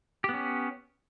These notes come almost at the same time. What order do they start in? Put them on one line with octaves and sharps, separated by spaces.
G4 B3 C#4